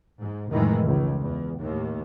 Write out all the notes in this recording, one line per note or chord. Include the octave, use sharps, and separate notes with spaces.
G#2
F1 A2 D#3 E3 G#3
C#2
E2
D#2 A2